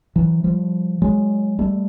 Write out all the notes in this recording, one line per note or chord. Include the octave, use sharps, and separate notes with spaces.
E3 F#3
F3 G3
F#3 G#3
G3 A3